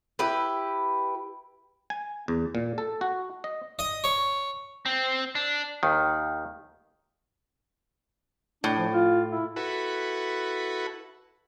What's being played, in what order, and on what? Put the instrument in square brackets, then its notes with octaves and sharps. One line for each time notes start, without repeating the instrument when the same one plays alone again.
[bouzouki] E4 G4 B4
[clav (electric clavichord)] G#5
E2
A#2
A4
F#4
D#5
[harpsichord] D#5
C#5
[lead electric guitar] C4
D4
[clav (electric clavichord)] D#2 D#3
[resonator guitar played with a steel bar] A2 [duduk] D4
[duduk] F3
F4
E4
[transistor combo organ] E4 F#4 A4 B4